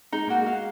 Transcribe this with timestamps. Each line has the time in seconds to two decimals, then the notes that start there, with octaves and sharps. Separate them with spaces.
0.12 G#3 D#4
0.28 A#3 F#4
0.41 G#3
0.46 F5